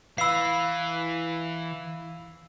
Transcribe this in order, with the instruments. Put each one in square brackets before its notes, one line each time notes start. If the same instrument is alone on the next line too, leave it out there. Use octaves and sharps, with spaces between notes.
[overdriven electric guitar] E3 [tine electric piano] F5 B5 [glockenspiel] E6 C7